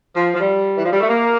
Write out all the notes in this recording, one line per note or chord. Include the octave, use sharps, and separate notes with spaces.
F3
F3
G3
E3
F3
G3
A3
A#3